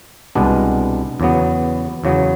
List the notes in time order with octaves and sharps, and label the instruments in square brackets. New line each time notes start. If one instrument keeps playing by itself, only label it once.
[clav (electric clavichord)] C2 B2 G#3 B3 D4
E2 C#3 F#3 B3
E2 C#3 F#3 B3